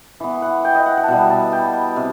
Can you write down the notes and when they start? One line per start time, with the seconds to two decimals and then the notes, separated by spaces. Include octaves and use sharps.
0.20 E3 B3
0.42 F#5
0.65 G5
0.75 D#5
0.86 F#5
0.97 F#5
1.03 A5
1.08 B2 G3 B3 G5
1.30 A5
1.53 G5
1.96 C3